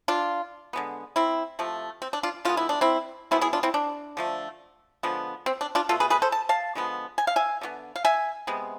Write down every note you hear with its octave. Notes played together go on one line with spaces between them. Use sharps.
D4 F4
D3 G#3 B3
C4 E4
C3 F3 A3
C4
D4
D4 F4
D3 G#3 B3 F4
E4
D4
C4 E4
B2 G#3 B3 C4 E4
E4 G#4
D4 F4
C4 E4
D4
D3 F3 A3
D3 F3 G#3 B3
C4
D4
D4 F4
B2 A3 F4 A4
G#4 B4
G#4 B4
A4 C5
A5
F5 A5
D3 F3 G#3 B3
G#5
F5
E5 G#5
D3 G#3 B3
F5
E5 G#5
C3 G#3 B3